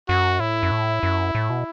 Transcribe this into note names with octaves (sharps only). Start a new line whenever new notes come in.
F#2 F#4
A2 E4
F#2
A2
F#2
A2
B2